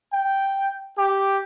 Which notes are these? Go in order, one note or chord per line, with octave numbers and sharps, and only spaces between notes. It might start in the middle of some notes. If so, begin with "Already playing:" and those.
G5
G4